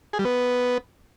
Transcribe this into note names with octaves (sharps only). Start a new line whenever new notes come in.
G#4
G3
B3